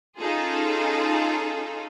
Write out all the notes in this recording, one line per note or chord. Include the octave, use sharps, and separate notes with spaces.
C#4 D#4 F4 G#4 A4